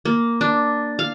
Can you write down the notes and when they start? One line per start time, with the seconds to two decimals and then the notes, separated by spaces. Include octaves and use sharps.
0.05 A#3
0.41 D4
0.99 F5